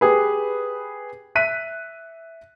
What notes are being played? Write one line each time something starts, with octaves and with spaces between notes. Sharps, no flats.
G4 G#4 B4
E5 F#6 B6 D#7